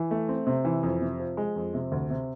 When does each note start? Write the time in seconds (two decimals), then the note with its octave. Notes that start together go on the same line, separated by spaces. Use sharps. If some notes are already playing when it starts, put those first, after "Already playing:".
Already playing: E3
0.11 A3
0.29 C4
0.47 C3
0.65 E3
0.83 F2
1.01 C3
1.20 F3
1.37 G#3
1.56 F2
1.74 C3
1.92 D2
2.10 C3